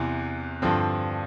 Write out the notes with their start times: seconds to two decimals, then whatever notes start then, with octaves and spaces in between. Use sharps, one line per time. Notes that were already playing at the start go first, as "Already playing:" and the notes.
Already playing: E2 C3 E3
0.62 G2 D3 F3 C4